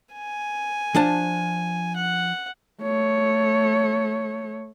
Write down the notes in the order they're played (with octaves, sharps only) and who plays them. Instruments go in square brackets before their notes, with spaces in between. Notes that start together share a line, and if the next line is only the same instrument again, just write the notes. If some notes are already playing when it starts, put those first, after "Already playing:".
[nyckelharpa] G#5
[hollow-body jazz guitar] F3 D4 A5
[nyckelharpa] F#5
[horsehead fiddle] A3 C#5